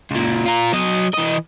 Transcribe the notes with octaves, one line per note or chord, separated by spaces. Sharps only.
C#2 A#2
F4 A#4
F#3 D#5
E3 D#5